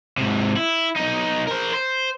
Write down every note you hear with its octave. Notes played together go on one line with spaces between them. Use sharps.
G#2 C3
E4
B1 D#4
A#4 C5
C5